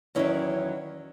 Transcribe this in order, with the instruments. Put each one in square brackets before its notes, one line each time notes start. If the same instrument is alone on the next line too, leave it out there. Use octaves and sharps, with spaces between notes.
[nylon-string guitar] E2 D#3 F#3 C#4 E4